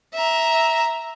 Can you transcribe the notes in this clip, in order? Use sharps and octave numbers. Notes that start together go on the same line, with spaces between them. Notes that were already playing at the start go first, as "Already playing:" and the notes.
E5 A#5